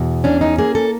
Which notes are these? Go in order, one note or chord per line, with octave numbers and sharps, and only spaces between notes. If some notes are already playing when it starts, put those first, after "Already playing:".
Already playing: E2 B2
C#4 D4
D#4
A#3 G#4
A4